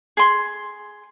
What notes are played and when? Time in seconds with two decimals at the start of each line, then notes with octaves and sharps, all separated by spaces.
0.17 G#4 C6